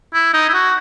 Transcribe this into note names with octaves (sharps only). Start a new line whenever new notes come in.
E4
D#4
E4
F#4